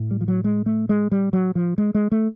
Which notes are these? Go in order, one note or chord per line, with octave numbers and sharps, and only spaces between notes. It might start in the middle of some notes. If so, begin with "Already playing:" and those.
Already playing: A2
G3
F3
F#3
G#3
A3
G#3
G3
F#3
F3
G#3
G#3
A3